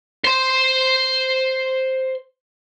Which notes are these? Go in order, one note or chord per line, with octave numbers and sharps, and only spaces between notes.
C5 C6